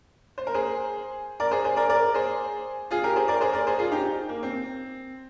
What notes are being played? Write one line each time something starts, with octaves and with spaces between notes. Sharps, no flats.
C5
A#4
G#4 C5
A#4 D5
G#4 C5
G#4 C5
A#4 D5
A#4 D5
G#4 C5
F4 G#4
G4 A#4
G#4 C5
A#4 D5
G#4 C5
A#4 D5
G#4 C5
F4 G#4
D#4 G4
A#3
C4